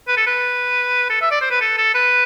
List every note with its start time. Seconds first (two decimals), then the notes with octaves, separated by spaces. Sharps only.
0.08 B4
0.17 A4
0.27 B4
1.10 A4
1.22 E5
1.31 D5
1.41 C5
1.51 B4
1.61 A4
1.77 A4
1.94 B4